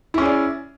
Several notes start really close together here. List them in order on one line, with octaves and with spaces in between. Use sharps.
E4 C#4 G#4 D5